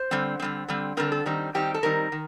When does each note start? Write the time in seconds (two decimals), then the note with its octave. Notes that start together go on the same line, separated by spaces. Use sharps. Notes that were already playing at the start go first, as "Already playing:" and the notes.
Already playing: C5
0.11 D3 G3 C4
0.39 D3 G3 C4
0.68 D3 G3 C4
0.97 D3 G3 C4 A#4
1.12 A4
1.26 D#3 G3 C4 D#4
1.54 D#3 G3 C4 D#4 G4
1.74 A4
1.83 D#3 G3 C4 D#4 A#4
2.12 D#3